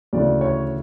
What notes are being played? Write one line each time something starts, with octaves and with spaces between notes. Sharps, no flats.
D2 C#3 E3 D5
C#5